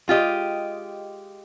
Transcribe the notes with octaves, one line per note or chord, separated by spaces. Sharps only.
G#3 F4 G4 D#5